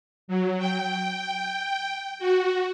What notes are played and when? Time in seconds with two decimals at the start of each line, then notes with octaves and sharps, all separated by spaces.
0.28 F#3
0.58 G5
2.19 F#4